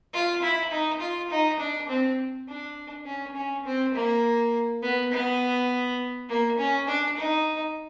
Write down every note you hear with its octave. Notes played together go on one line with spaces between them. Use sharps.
F4
E4
D#4
F4
D#4
D4
C4
D4
C#4
C#4
C4
A#3
B3
B3
A#3
C#4
D4
D#4